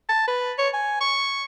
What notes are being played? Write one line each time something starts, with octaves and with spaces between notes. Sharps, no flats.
A5
B4
C#5
G#5
C#6